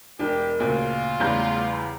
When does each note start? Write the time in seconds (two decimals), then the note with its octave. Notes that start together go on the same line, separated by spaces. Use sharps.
0.19 E1 D4 G4 A#4
0.60 D2 A#2 C#3 F4
1.20 E2 C#3 G3 A3 A#5 G6